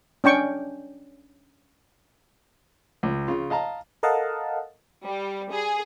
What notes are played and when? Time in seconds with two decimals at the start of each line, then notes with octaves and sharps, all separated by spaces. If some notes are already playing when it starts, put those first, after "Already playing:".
0.24 C#4 D4 G5 C#6
3.03 C#2
3.28 C#3 F4
3.50 D#5 F5 A5 A#5
4.03 A4 A#4 D#5 F5 F#5 A5
5.06 G3
5.51 G#4